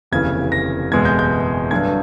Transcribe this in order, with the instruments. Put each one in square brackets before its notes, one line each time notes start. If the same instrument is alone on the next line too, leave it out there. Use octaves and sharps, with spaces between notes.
[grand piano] F1 D#2 C#3 E3 G#6
A#6
F#1 E2 B2 G#3 G#6
G6
G6
G2 D3 F#3 B3 D4 G#6